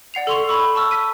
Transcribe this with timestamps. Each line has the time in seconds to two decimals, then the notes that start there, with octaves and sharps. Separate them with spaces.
0.14 D5 F#5 C7 F7
0.27 A4 D5 C6 C#6 F7
0.48 B5 C#6 E6
0.75 A5 C#6 E6 F6
0.91 E6 B6 D#7